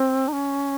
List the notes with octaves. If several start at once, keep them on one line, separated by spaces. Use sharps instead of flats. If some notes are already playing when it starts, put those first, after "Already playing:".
Already playing: C4
D#4
C#4